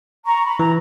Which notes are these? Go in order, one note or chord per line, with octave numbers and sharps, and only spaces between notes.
A#5 C#6
B5
E3 A#5